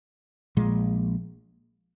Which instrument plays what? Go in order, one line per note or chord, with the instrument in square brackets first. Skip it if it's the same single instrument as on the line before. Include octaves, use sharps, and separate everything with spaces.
[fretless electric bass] A#1 A#2 G#3